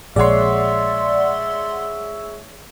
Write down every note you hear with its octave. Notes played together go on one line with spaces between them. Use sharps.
A#1 G#3 C#5 D5 E5 F#5 C6